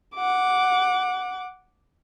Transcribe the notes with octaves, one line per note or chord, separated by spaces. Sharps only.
F#5 D6